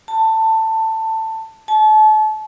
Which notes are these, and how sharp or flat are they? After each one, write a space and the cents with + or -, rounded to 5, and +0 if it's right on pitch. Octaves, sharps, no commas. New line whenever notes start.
A5 +15
A5 -35